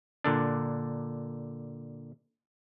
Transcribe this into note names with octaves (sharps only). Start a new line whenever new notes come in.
A#2 D3 D4